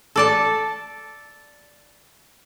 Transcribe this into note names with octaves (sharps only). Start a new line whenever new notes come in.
A4 D5 A5